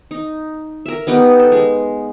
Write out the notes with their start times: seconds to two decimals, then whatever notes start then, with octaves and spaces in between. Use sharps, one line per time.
0.11 D#4
0.86 A#4 E5
1.07 B3 D#4 G4 B4
1.40 A4
1.52 G#3